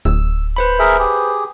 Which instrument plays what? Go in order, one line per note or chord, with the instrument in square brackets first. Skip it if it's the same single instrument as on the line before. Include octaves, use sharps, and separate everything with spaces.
[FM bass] D1 [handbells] E6
[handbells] B4 C5 B5
[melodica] G#4 A#4 E5
G4 G#4